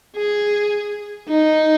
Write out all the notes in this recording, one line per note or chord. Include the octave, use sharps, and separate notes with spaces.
G#4
D#4